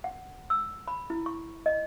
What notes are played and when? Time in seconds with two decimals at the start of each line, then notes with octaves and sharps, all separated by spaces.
0.04 F#5
0.50 E6
0.88 B5
1.10 E4
1.26 C#6
1.66 D#5